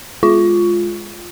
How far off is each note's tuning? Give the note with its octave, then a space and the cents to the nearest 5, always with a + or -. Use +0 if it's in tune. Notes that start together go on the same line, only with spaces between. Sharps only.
G#3 +0 F4 +0